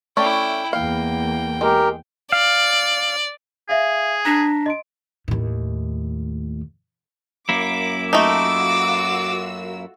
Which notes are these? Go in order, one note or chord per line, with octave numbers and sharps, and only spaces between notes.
A3 C#4 E4 D5 G5
E2 A#3 F5 G5
G#3 G4 A#4
D5 F5
G#4 E5 F5
D4 A#5 A#6 B6
D#5 C6 D7
D#2 A2
F#2 A#3 E4 D6
A3 D#4 F4 F#4 D6 E6